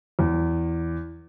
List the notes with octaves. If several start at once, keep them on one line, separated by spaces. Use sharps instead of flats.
E2